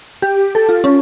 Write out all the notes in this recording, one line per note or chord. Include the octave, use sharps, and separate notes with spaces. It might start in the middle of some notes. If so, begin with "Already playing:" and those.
G4
A4
F4
C#4